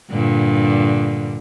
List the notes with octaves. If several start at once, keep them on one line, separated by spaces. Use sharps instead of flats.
G2 A#2 D3